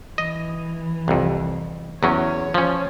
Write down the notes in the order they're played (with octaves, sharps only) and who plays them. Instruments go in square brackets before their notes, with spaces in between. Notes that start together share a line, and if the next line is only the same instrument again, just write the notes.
[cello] E3 [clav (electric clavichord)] D#5
[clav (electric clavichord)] C2 F2
[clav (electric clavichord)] E2 F#3 C#4 [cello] C#5
[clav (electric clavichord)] F3 C#4